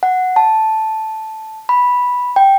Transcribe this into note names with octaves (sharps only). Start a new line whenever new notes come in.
F#5
A5
B5
G5